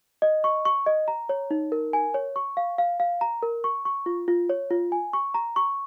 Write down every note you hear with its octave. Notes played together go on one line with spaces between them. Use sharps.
D#5
C#6
C#6
D#5
A#5
C#5
D#4
A#4
G#5
C#5
C#6
F5
F5
F5
A#5
A#4
C#6
C#6
F4
F4
C#5
F4
G#5
C#6
A#5
C#6